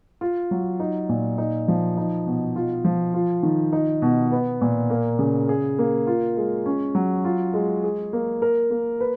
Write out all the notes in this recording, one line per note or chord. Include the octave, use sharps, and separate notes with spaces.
F4
F#3
D#4
A#2
D#4
F3
D#4
B2
F4
F3
F4
D#3
D#4
B2
B3
A#2
A#3
C#3
G#4
A#3
F4
G#3
C#4
F#3
F4
G#3
G#4
A#3
A#4
A#3
B4